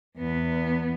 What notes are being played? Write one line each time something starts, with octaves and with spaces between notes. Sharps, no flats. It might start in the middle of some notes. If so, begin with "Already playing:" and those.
E2 B3